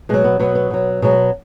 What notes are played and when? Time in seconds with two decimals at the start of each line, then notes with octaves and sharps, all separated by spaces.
0.09 B2 F#3 G#3
0.24 B3
0.40 B2 F#3 B3
0.55 B3
0.71 B2 F#3
1.02 B2 F#3 G#3